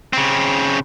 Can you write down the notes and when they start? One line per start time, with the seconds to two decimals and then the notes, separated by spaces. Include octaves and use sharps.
0.13 C#3 C4